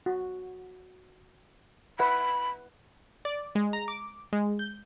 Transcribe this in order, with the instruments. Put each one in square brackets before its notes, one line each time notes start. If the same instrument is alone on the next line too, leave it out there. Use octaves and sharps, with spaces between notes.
[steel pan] F#4
[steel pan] B4 E5 F#5 [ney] B5
[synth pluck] D5
G#3
A#5
D6
G#3
G6